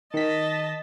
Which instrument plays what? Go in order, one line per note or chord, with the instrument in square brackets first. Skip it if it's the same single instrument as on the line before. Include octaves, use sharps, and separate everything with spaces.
[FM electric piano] D#3 B6 [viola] D#5 A5